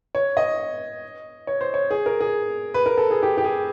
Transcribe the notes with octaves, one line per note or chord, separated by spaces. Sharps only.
C#5
D#5
C#5
C5
C#5
G#4
A#4
G#4
B4
A#4
A4
G#4
G4
G4
G#4